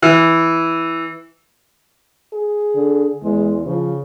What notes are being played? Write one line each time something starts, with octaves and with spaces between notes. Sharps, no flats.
E3
G#4
D3
E2 G#3
C#3 F3